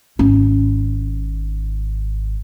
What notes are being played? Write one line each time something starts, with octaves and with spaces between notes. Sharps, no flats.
G#1 C#4